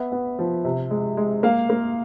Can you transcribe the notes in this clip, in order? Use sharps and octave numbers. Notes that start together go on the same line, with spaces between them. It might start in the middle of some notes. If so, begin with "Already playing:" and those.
Already playing: B3 E5
B3
F3
C3
G#3
G#3
A#3 F5
A#3